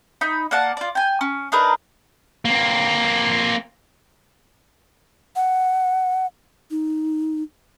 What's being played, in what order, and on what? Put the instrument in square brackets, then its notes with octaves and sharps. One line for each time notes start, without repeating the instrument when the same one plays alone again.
[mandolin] D#4 B5
A#3 D5 F#5 A5
F4 D5
G5 G#5
C#4
D4 D#4 A#4 B4
[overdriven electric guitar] A#3 C4
[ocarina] F#5
D#4